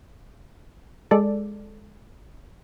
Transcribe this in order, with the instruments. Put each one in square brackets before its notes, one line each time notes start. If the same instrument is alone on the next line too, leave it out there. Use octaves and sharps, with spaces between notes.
[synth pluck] G#3 A4 D5